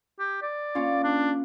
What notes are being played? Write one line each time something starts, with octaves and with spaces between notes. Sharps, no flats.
G4
D5
A#3 C#4 F4
D4